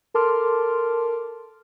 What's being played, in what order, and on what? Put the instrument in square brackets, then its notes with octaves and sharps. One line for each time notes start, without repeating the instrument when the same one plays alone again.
[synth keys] A4 A#4 A5 C6 D6 F6